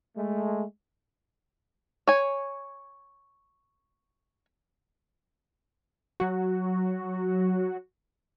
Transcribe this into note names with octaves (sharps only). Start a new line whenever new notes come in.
G#3 A3
C#5 G#5
F#3 F#4